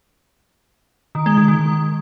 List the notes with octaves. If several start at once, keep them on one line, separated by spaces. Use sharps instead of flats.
D#3
G#3
D#3
D#3